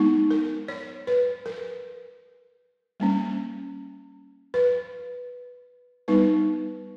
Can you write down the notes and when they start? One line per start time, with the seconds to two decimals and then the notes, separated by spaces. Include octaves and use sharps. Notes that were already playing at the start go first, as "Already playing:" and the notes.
Already playing: G#3 B3 D#4
0.31 A#4
0.68 C#5
1.07 B4
1.46 A#4
3.00 G3 A#3 C#4
4.54 B4
6.08 G3 B3 D#4 B4